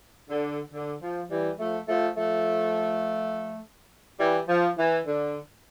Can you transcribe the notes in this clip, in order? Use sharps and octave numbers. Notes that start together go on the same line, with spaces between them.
D3
D3
F3
E3 G3
F3 A3
F3 A3
F3 A3
E3 G3
F3
E3
D3